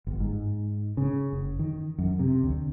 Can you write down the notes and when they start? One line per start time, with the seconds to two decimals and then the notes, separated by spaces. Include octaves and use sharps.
0.07 G1
0.20 G#2
0.97 C#3
1.33 F#1
1.59 D#3
1.98 F#2
2.19 C3
2.43 D2